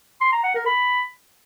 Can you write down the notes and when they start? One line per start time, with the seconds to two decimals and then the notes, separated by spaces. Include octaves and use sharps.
0.21 C6
0.32 A#5
0.44 F#5
0.55 A#4
0.66 B5